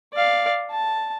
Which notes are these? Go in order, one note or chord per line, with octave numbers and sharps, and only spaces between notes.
D5 F5
A5